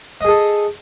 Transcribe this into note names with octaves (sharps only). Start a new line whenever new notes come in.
G#4 A4 D#5